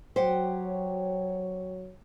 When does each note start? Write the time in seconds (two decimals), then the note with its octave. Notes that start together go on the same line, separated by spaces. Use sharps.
0.16 F#3 G4 C5 C#5 F#5